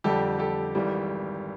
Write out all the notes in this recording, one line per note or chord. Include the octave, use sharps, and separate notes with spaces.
F2 D3 G3 G4 A4
G4 A4
G#1 G#2 E3 G3